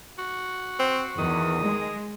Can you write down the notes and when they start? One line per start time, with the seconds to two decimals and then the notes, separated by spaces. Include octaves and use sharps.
0.18 F#4
0.79 C4
1.18 E2 D#3 D#6
1.62 G#3